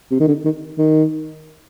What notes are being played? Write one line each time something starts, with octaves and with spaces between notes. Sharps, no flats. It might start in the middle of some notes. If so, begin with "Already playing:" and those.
C3
D#3
D3
D#3
D#3